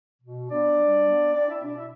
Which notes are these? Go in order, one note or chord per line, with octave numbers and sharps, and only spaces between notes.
B2
B3 D4 D5
G3
B3
C4 D4 D5
E4 E5
B2 D4 D5
E4 E5